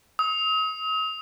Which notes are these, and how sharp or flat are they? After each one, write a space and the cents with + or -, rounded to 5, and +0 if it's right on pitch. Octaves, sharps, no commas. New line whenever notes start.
D#6 +40